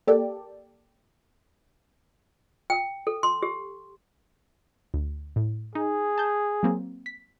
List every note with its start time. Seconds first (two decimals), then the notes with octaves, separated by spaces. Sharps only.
0.07 A#3 G4 A4 D5
2.70 G5
3.07 A4
3.23 C6
3.43 G4
4.94 D2
5.36 A2
5.75 D#4 G#4
6.18 A5 G6
6.63 F#3 A#3 C4
7.06 B6